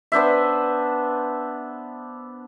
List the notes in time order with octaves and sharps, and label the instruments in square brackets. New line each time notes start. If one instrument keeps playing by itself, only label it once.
[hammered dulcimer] B3 D4 C5 E5